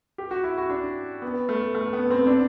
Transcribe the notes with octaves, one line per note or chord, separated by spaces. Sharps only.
G4
F#4
E4
F#4
D4
B3
A3
A3
B3
C4
D4